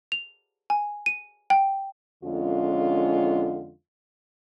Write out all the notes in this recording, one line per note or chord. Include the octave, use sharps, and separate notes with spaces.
F7
G#5
D#7
G5
F2 D3 G#3 C#4 F4